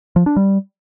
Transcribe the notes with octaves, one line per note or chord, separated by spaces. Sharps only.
F3
D4
G3